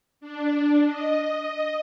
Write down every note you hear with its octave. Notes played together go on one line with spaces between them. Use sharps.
D4
D#5